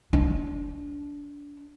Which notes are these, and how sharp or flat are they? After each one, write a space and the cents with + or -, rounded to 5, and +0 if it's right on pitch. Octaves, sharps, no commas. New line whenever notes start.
D4 -25